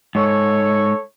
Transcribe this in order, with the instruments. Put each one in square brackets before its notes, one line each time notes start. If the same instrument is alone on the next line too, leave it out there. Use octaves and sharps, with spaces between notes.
[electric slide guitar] G#2 [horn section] A4 C#5